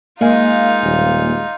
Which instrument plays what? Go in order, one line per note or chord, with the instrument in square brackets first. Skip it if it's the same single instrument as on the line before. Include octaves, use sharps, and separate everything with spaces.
[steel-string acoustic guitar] G#3 [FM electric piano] A#3 F5 G#5 [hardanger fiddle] D#4 F4
[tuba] D#1